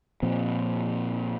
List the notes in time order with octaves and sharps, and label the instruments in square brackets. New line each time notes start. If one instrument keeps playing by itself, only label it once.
[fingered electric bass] A#2 F3 C4